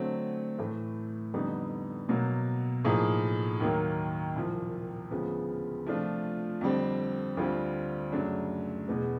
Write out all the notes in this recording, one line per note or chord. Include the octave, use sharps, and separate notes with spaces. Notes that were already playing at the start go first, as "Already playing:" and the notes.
Already playing: D3 F#3 A3 C4
A2 E3 A3
F2 D3 G3 B3 D#4
B2 F#3 A#3
A2 F3 A#3 D#4 G#4
D#2 D#3 F#3 A#3
C2 A#2 F3
D2 C#3 F3 G#3 B3
C3 F3 A3 D4 F4
F2 D3 G3 C4
D2 D3 G3 C4 F4
F#2 C#3 F#3 A3 D4
E2 B2 G#3 B3